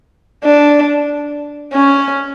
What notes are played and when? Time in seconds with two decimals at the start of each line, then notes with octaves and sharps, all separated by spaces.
0.44 D4
1.73 C#4